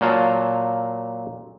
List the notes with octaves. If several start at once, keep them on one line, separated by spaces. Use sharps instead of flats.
A#2 F#3 F5 A5